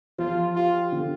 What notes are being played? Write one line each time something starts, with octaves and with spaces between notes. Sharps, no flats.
F3 F4
F4 G4
D3